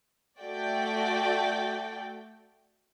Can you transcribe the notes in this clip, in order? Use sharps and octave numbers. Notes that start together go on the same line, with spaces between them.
A3 F#4 D5 G5